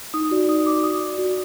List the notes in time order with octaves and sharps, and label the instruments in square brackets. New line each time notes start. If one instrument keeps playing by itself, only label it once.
[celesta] D#4 D#6
F#4 D5
D#4 D#6
F#4 D5 D6
F#4 D#6
D5
F#4